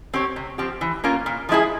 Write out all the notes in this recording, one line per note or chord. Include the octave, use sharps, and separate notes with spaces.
C4 G4 C#5
C3
F3 C4 G4
E3
A#3 C#4 F4 A#4
A#2
F3 G#3 E4 G#4